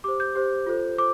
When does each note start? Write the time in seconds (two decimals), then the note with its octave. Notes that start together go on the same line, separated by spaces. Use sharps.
0.04 G4 C5 D6
0.20 G6
0.35 G4 C5
0.66 F4 A4 C5
0.98 C5 D6